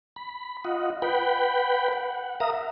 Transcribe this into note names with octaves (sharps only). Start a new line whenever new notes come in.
B5
F4 D#5 F#5
B4 F#5 G5 B5
F#5
A#4 E5 F5 A#5 D#6
E5